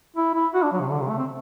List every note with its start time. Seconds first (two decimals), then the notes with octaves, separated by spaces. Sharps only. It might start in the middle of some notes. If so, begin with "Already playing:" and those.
0.16 E4
0.34 E4
0.54 F#4
0.63 D4
0.72 F#3
0.81 C3
0.91 D3
1.00 C3
1.09 A3
1.18 C4